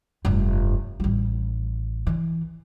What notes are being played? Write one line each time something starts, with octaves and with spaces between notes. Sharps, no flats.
F1 G2
A1 G3
E3